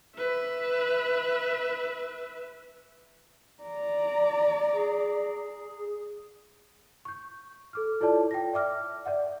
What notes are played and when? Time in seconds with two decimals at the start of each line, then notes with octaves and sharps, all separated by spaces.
0.17 B4 E5
3.63 D5 A#5
4.73 G#4
7.05 C#6 G6
7.73 A4 D6 F6
8.01 E4 F4 A4 C#5 D5 A5
8.31 G5 A#6
8.53 D5 E5 D6 F6
9.06 D5 E5 F#5